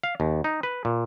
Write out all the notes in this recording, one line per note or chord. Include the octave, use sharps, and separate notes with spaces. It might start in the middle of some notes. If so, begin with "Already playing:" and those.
F5
D#2
D#4
B4
A#2